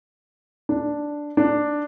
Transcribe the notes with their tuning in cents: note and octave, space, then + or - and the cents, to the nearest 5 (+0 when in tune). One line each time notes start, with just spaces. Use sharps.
D4 +0
D4 +5